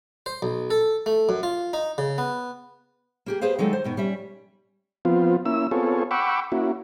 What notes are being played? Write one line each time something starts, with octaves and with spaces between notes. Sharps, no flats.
C5
B1
A4
A3
F#2
F4
D#4
C#3
B3
A#3 G4 G#4
G#4 B4 C5 F5
D#3 F#3 G#3 A3 D#4 A4
C5
G#2 B2 D#3
G3 C#4 E5
F3 B3 C4 F4
A#3 C#4 E4 E6
B3 C4 F4 G#4 A4 C#5
F#5 G5 B5 C#6 D6 E6
A#3 C#4 E4 F#4